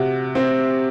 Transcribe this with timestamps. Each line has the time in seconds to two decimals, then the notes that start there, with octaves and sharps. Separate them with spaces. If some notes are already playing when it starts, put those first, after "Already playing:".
Already playing: C3 F#4
0.35 C4